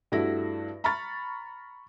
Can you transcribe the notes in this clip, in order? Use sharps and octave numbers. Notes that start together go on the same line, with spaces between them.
G2 A3 E4 F#4 A#6
A#5 B5 C#6 F6 A6